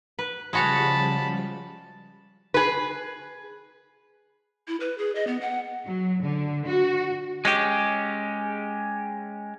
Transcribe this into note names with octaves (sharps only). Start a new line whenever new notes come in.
B4
C#3 F3 G3 G#3 F#4 C#5 A5 B5
G#4 B4
E4
B4
G#4
D#5
B3
F#5
F#3
D3
F#4
G#3 C#4 G4